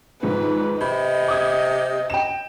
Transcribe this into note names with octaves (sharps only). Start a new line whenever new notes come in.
G#2 D#3 F3 B4
C3 D#5 B5
D6 D#6 G#6
G5 E7